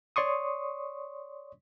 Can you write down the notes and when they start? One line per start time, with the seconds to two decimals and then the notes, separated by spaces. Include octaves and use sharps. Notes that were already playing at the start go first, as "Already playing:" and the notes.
0.16 C#5 D5 C6 C#6 D#6